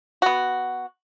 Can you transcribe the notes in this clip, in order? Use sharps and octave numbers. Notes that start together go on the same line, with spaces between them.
B3 F#4